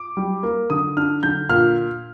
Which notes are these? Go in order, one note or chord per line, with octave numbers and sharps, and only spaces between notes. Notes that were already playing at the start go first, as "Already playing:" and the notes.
Already playing: D6
G3
A#3
D3 D#6
D4 F6
D3 G6
A#2 F6